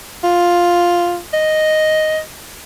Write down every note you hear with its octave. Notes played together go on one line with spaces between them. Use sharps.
F4
D#5